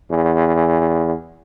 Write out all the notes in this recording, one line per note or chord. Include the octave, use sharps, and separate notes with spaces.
E2